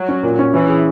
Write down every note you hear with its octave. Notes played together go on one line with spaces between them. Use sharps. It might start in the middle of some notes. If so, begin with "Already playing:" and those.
Already playing: F#3
C#4
A#2
C#4
E3 C#4
G#4